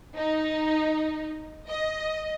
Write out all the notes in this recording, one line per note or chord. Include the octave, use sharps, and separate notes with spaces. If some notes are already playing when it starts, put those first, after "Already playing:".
D#4
D#5